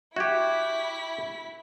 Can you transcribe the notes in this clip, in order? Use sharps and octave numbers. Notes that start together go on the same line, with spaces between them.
E4 F#4 G4 E5 G#6 B6